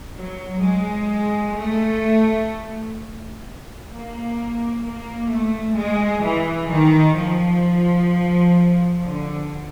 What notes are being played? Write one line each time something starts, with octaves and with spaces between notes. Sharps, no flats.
F#3
G#3
A3
A#3
A#3
A3
G#3
E3
D#3
F3
D3